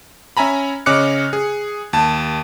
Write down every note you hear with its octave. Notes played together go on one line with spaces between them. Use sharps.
C#4 E5 G#5 A#5 B5
C#3 C#4 D#5 D6 F#6 C#7
G#4
D#2 A5